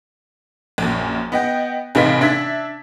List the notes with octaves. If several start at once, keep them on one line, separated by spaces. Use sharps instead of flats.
A#1 F#2
B3 D#5 G5
A1 C3 D#4 B4 F5 B6
D4 E5 G#6 B6